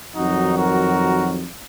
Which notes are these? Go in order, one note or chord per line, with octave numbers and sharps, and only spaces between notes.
F2 D#3 F#3 D#4 F#4
F#4 A#4